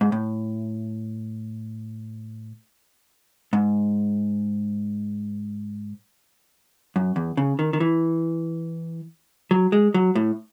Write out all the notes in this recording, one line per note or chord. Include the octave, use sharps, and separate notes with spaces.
G#2
A2
G#2
F#2
E2
C#3
D#3
D#3
E3
F#3
G#3
F#3
A2